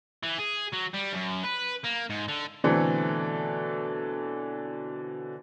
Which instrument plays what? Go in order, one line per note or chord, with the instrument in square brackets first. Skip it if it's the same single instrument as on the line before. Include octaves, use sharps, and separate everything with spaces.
[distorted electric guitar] E3
G#4
F#3
G3
F#2
B4
A#3
G#2
D3
[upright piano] B2 D3 E3 F#3 A3 C4